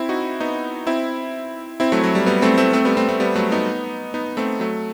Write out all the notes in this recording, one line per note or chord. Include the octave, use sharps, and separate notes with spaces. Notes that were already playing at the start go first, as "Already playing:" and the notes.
Already playing: C4 E4
D#4 F#4
B3 D#4
C4 E4
C4 E4
F#3 A3
F#3
G3
G3 B3
A3 C4
A3 C4
A3 C4
G3 B3
A3 C4
A3 C4
G3 B3
F#3 A3
B3 D#4
B3 D#4
A3 C4
F#3 A3